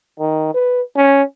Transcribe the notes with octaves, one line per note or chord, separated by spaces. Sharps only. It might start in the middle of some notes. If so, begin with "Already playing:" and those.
D#3
B4
C#4